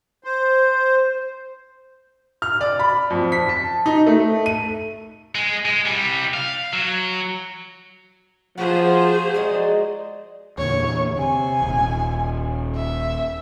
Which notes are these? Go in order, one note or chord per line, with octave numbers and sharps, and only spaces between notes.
C5
F6
D5
B5
F2
B6
A5
D#4
A3
D#7
G#3
G#3
C2 G3
F5
F#3
F3 B3 F#4 G#4 C5
F#3 G#3 D5 D#5
E2 A#2 D3 C#5
C3 G#5
D#1
E5